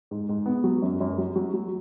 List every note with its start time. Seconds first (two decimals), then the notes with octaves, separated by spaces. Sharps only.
0.11 G#2
0.29 G#2
0.46 B3
0.64 F#3
0.82 F#2
1.00 F#2
1.18 F#3
1.36 F#3
1.54 F#3